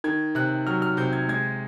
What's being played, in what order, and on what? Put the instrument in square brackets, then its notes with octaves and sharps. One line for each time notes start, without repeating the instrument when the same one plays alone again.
[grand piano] D#3 G#6
C3 F#6
F#3 F6
F6
C3 G6
G#6
G#3 G#6